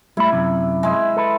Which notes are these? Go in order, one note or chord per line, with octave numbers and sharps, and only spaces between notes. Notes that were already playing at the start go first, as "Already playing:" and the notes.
G3 A3 E4 B5
F#2 C3
G#3 E4
A4 B4